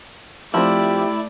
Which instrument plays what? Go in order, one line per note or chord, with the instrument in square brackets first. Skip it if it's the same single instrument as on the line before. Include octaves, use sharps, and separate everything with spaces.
[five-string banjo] F3 C4 [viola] A3 D5 [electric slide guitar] E4 [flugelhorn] G4